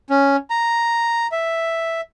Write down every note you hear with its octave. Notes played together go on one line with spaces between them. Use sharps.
C#4
A#5
E5